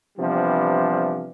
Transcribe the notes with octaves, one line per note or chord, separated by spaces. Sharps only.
C3 E3 F3 G3 B3 D4